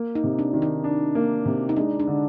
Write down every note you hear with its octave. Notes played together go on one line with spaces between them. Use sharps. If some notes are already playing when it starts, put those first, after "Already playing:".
Already playing: A#3
D#4
C3
D4
D#3
D#4
D4
A#3
C3
D#4
G#3 D4
D4
D3